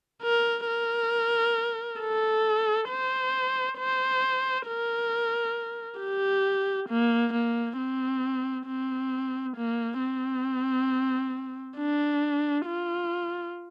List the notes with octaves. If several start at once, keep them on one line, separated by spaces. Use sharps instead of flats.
A#4
A#4
A4
C5
C5
A#4
G4
A#3
A#3
C4
C4
A#3
C4
D4
F4